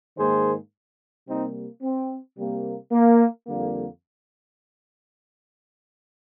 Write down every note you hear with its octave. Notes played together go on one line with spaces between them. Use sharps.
G#2 D#3 A#3 G#4 C5
C3 G3 A#3 C4 D#4
C4
C3 G3 A#3
A#3
F2 D3 G3 A#3